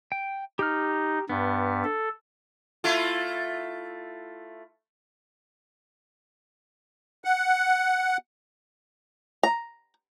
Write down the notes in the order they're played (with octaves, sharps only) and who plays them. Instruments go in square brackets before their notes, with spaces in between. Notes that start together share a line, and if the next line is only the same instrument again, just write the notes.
[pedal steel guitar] G5
[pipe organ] D#4 [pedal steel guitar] G4 F6
[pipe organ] G2 [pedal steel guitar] B3
[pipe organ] A4
[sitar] A3 E4 F4
[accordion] F#5
[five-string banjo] A#5